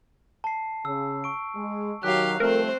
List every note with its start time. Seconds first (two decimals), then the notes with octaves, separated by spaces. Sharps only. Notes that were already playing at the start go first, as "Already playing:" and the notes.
0.44 A5 C7
0.85 C#3 E6
1.24 C#6 D7
1.56 G#3
2.03 D#3 F#3 G4 F5 F#6
2.40 F3 G3 A3 C4 A#4 C5